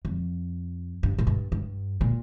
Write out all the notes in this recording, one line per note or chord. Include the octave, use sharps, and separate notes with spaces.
F2
G2
A#2
G2
G2
A#2